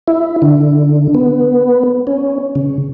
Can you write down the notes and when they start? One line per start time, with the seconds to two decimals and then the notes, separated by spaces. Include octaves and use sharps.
0.08 E4
0.42 D3
1.14 B3
2.07 C#4
2.55 C#3